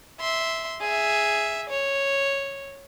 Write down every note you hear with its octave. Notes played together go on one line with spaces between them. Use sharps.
E5 C6
G#4 E5
C#5